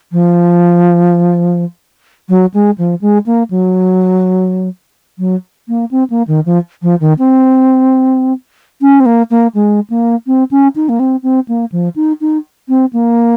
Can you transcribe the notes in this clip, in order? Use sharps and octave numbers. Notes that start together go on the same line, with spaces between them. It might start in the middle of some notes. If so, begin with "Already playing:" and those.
F3
F#3
G#3
F3
G#3
A#3
F#3
F#3
A#3
C4
A#3
D#3
F3
F3
D#3
C4
C#4
C4
A#3
A#3
G#3
A#3
C4
C#4
D#4
A#3
C4
C4
A#3
F3
D#4
D#4
C4
A#3